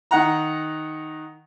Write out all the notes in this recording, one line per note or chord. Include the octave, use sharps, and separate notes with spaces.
D#3 F#5 A#5